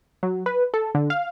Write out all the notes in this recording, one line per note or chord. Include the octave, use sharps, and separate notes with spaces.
F#3
B4
A4
D3
F5